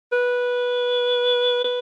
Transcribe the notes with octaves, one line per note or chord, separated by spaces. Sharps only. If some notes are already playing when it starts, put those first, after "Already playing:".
B4
B4